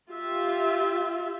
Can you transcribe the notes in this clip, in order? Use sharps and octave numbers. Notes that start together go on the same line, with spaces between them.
F4 G4 E5